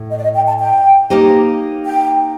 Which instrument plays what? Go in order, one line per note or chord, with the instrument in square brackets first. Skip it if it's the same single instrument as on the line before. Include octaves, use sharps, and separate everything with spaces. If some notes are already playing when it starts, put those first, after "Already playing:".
Already playing: [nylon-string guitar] A2
[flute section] D#5
D5
D#5
G5
A5
G5
[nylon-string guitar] A#3 D#4 G4 C5 D#5
[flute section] G5